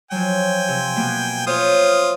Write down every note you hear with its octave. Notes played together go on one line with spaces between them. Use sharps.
F3 F#3 G5 G#5
C3
B2 A#3 B3
F4 C5 C#5 E5 D#6